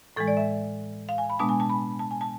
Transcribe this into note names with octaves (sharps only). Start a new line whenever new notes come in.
A2 E3 G#3 A4
D5
E5
F5
G#5
B5
B2 G#3 B3 D4 A5
G#5
A5
B5
A5
G#5
A5